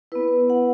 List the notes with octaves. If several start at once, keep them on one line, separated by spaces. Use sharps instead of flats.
B3 E4 B4
F#5